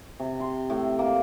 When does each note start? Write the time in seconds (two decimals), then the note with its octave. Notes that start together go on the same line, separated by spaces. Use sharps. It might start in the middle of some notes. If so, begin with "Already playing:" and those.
0.20 C3
0.40 C6
0.70 A2
0.99 A#3